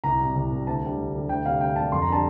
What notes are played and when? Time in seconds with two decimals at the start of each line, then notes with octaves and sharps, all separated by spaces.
0.04 C2 A#5
0.20 C3 G3
0.36 C2
0.51 C3 G3
0.67 D2 A5
0.82 D3 G3
0.98 D2
1.14 D3 G3
1.29 D2 G5
1.45 C3 G3 F5
1.61 D2 G5
1.76 C3 G3 A5
1.92 F2 C6
2.02 A#5
2.08 D3 G3 A5